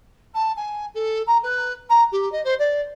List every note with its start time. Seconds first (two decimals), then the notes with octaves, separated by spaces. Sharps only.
0.34 A5
0.56 G#5
0.94 A4
1.27 A#5
1.43 B4
1.89 A#5
2.12 G4
2.32 D#5
2.44 C5
2.59 D5